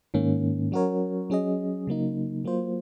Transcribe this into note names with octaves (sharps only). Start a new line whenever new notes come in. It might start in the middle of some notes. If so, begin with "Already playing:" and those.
G#2 D#3 A#3 C#4
F#3 C#4 F#4 A#4 C#5
F#3 C#4 G#4 D#5
C#3 F#3 A#3 D#4
F#3 A#3 F4 C5